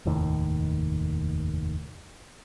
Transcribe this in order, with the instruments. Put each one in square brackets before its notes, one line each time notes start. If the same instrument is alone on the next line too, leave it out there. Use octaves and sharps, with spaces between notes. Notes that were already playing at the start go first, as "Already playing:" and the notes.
[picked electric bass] F1 D#2 A2 D#3